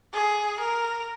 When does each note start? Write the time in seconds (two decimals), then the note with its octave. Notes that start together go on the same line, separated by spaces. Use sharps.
0.13 G#4
0.60 A#4